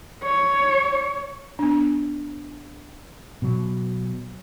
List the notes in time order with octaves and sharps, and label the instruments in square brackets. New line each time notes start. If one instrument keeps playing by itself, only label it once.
[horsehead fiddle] C#5
[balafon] B3 D4
[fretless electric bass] B2 F#3